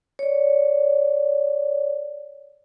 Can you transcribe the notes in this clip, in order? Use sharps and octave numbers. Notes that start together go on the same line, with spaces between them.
C#5 D5